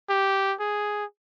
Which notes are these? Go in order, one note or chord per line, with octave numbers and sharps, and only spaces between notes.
G4
G#4